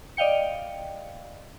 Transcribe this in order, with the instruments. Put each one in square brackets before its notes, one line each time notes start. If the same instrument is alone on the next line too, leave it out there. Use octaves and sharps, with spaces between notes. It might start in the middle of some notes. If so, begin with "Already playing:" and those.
[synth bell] D5 D#5 F5 G5 C#7